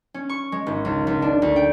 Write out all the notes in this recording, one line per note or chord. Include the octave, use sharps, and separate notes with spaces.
C#4
C#6
G#3
G#1
C#2
C#2
D4
D2
G5